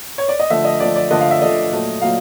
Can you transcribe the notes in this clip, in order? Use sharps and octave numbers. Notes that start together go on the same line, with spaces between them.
C#5
D5
D#5
D3 F3 A3 E5
D#5
D3 F3 A3 D5
D5
D3 F3 A3 D#5
F5
E5
D3 F3 A3 D#5
A#2 F#3 A3
A#2 F#3 F5